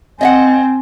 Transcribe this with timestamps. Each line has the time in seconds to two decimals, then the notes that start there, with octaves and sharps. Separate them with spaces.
0.21 C4 D#5 E5 F#5 G#5